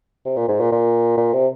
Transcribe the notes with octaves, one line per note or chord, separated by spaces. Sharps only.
C3
A#2
G#2
A#2
A#2
A#2
C3